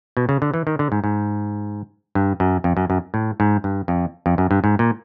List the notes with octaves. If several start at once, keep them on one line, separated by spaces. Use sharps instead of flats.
B2
C#3
D3
E3
D#3
D3
G#2
G#2
G2
F#2
F2
F#2
F#2
A2
G#2
G2
F2
F2
F#2
G2
G#2
A#2